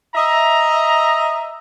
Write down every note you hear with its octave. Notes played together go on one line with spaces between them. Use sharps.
D#5 E5 A#5